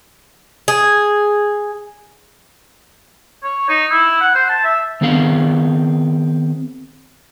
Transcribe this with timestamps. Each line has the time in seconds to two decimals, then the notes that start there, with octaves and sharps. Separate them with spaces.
0.68 G#4
3.43 C#5
3.69 D#4
3.91 E4
4.21 F#5
4.35 C5
4.49 A5
4.64 E5
5.01 D#3 B3 C4 G#4 F5